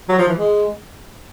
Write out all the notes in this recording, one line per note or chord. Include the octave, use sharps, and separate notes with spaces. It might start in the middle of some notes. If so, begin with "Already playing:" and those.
F#3
F3
E3
G#3